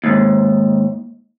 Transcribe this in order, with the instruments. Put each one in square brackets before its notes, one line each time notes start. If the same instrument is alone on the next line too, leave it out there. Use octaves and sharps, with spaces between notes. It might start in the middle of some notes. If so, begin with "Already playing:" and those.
[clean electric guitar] D#2 G#2